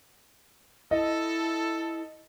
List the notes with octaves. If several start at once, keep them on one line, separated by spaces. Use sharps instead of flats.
E4 A4 D#5